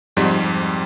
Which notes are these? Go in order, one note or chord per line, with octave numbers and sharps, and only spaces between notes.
F2 G#2 G3